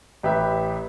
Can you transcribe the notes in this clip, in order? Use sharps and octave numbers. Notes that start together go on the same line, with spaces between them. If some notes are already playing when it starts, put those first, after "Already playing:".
A1 G4 B4 E5